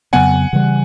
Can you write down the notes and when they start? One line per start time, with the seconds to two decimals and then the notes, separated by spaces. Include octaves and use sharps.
0.13 F2 C#3 F#3 B3 F#5 G#5
0.53 C#3 E3 G3